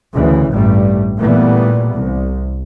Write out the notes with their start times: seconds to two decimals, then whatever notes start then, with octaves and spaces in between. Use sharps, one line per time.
0.15 D2 C#3 E3
0.52 A1 G2 G3 A3
1.20 A#2 E3 G3 A3 B3
1.94 C2